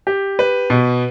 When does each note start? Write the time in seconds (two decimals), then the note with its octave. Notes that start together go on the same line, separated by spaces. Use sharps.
0.07 G4
0.39 B4
0.70 B2